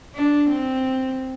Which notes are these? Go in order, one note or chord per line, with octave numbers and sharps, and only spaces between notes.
D4
C4